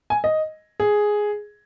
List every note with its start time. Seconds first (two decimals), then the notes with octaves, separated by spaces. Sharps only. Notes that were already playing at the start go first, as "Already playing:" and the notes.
0.10 G#5
0.24 D#5
0.80 G#4